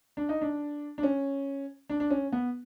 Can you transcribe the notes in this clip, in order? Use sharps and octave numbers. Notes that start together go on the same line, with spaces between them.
D4
D#4
D4
D4
C#4
D4
D4
C#4
B3